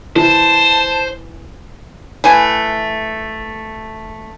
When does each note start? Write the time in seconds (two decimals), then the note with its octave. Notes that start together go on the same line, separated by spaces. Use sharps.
0.16 E3 C5 A5
2.24 E3 A3 G#5